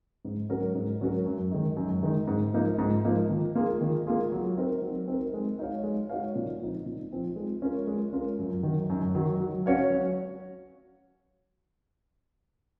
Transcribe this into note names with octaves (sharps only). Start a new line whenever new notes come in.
G#2
F#3 C#4 F#4 A#4
G#2
F#3 C#4 F#4 A#4
F#2
D#3 G#3 D#4
F#2
D#3 G#3 D#4
G#2
F3 A#3 D#4
G#2
F3 A#3 D#4
D#3
A#3 F4 G#4
D#3
A#3 F4 G#4
F#3
C4 D#4 A#4
F#3
C4 D#4 A#4
G#3
D#4 F#4 C#5 F5
G#3
D#4 F#4 C#5 F5
A#2
F3 C4 D#4
A#2
F3 C4 D#4
G#3
C#4 F4 A#4
G#3
C#4 F4 A#4
F#2
D#3 F#3
F#2
D#3 F#3
F#3
C#4 F#4 C#5 F5
F#3